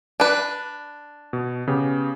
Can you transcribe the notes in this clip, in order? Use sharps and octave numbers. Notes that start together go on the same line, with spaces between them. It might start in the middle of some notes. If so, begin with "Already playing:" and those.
D4 B4
B2
C#3 B3 G4